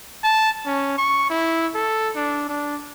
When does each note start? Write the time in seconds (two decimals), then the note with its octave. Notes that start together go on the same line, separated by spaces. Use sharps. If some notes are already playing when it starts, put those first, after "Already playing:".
0.24 A5
0.66 C#4
0.98 C#6
1.30 E4
1.75 A4
2.16 D4
2.49 D4